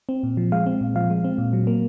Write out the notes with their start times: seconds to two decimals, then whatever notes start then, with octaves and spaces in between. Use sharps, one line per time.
0.09 C4
0.23 A#2
0.37 F3
0.52 G#3 F5
0.66 C4
0.81 A#2
0.96 F3 F5
1.10 G#3
1.24 C4
1.38 A#2
1.53 F#3
1.67 A#3